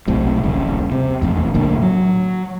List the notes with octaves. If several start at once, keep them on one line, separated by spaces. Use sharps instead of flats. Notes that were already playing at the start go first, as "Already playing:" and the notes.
B1 A2 C3
D#1 A#1 C#3
C3
E1 A1 F2
B1 A2 D3 A#3
F#3